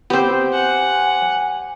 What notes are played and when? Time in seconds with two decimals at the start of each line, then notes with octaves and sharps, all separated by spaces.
0.10 B3 C4 G4 C5
0.53 F#5 G#5